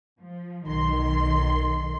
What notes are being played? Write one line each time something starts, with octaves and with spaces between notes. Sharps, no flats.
F3
B1 D#3 C6